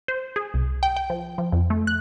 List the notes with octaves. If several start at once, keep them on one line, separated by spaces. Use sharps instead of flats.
C5
G#4
C2
G5
G5
F3
F3
F2
A3
F#6